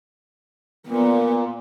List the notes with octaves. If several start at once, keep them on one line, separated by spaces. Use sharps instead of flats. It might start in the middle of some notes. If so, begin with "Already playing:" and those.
A#2 B3